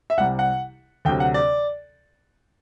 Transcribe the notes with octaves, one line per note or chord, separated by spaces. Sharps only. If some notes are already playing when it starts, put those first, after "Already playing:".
E5
C2 C3 G3 F#5
F#5
D2 C3 F#3 G5
F#5
D5